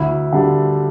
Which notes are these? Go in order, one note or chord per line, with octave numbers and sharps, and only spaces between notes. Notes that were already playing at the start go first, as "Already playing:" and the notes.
Already playing: D2 E4
D3 G3